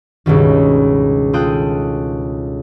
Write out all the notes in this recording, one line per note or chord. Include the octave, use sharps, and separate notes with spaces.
C#2 G2 B2 D#3
F4 A4 G5 D#6 F#6